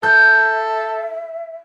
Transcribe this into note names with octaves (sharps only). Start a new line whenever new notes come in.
A4 E5 G6